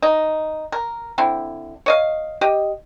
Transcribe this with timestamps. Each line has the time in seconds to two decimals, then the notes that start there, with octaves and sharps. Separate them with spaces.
0.02 D#4
0.72 A#4
1.18 D3 C4 E4
1.86 C#5 D#5 F5
2.41 G4 D#5